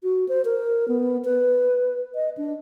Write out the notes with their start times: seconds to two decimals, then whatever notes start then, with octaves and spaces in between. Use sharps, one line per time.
0.03 F#4
0.29 C5
0.45 A#4
0.88 B3
1.25 B4
2.15 D#5
2.37 D4